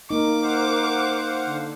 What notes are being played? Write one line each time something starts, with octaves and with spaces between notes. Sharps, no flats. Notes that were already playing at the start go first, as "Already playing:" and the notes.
A#3 D#4 A#4 D6
C5 F5 F#5
D3